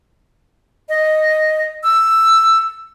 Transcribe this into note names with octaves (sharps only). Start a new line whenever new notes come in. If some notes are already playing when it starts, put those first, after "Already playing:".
D#5
E6